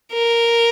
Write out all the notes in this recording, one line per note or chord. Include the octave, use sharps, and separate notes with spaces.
A#4